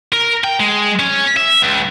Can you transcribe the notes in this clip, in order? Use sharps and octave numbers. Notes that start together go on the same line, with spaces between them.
A#4
G5
G#3
C#4
E5
C#2